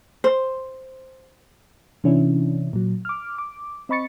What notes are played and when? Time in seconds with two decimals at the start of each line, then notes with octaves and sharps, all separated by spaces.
0.24 C5
2.04 C3 E3 C#4 D4 E4
2.73 A#2 F#3
3.05 D6 F6
3.38 D6
3.89 C4 D#5 B5 C#6 A6 C#7